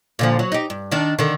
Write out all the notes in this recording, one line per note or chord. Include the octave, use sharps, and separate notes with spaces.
A#2 D3 F3
F#3
D#4 G4
G2
D#3 D4
D3 D#3